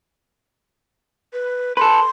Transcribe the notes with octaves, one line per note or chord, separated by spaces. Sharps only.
B4
A4 B4 C6